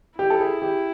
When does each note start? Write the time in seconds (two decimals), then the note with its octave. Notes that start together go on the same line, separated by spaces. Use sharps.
0.19 E4 G4
0.30 A4
0.40 G#4
0.62 G4